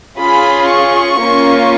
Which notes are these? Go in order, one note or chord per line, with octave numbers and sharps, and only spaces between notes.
C#4 F4 G#4 B5
C#6
A#3 C#4 F4